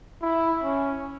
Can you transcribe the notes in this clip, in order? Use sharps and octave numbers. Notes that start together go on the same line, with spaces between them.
E4
C#4